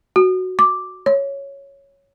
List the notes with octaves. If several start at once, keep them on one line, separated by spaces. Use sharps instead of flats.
F#4
D6
C#5